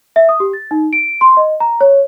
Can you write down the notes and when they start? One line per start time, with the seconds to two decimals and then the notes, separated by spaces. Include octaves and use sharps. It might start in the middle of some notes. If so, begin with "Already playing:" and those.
0.16 E5
0.29 D#6
0.40 G4
0.53 A6
0.71 D#4
0.93 D7
1.21 C6
1.37 D#5
1.60 A#5
1.81 C#5